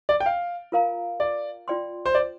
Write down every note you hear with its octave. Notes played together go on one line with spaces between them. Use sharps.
D5
G5
F5
F4 A#4 F5 A#5
D5
F4 D5 G5 C6
C5
D5